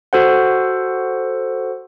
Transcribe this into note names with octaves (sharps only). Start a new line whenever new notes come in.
F#4 A4 C5 F#5